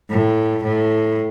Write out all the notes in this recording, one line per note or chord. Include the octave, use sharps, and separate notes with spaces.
A2
A2